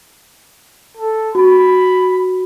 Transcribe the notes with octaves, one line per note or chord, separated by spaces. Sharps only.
A4
F#4 B5